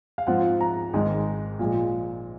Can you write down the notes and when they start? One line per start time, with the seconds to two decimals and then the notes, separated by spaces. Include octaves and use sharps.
0.18 F5
0.27 G#2 F3 C4 F4 F#5
0.61 A#5
0.93 G#1 G#2 D#3 G#3 D#4
1.59 A#2 F3 G#3